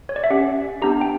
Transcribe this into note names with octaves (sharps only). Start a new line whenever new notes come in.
C#5
D5
E5
C#4 G4 F#5
B3 D4 G4 A#5
G5